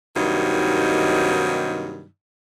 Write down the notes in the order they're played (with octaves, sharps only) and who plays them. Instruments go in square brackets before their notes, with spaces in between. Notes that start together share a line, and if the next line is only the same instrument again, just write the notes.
[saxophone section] G2 C3 D#3 F#3 A#3 D#4